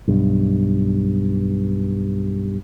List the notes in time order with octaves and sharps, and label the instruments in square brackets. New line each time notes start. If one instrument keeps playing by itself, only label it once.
[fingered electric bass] B1 G2